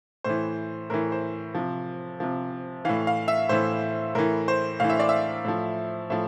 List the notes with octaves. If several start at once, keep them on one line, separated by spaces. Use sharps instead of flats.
A2 E3 C5
A2 E3 A#4
C5
C3 F3
C3 F3
A2 E3 F5
F5
E5
A2 E3 C5
A2 E3 A#4
C5
A2 E3 F5
E5
D5
E5
A2 F3
A2 F3 E5